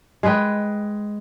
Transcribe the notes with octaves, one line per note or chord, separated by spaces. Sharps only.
G#3 G#4 B4 G5